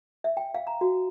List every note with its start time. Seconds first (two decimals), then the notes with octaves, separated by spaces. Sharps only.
0.24 E5
0.37 G5
0.54 F5
0.67 A#5
0.81 F#4